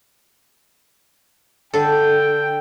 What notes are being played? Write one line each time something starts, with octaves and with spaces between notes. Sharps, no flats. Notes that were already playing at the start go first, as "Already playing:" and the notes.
D3 A4 G5